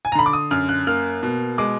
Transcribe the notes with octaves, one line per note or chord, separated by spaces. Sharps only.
G#5
A#5
D3 B5
D6
D#6
F#2 F6
F#6
A#3 F6
B2
G#3 D6